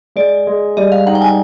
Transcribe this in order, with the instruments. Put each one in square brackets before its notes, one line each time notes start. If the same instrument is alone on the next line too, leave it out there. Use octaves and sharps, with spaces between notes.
[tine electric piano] G#3 [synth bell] D5
[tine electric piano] G#3
[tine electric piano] G3 [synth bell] D#5
[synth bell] F5
[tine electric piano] D#4 [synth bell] F#5
[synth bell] G5
G#5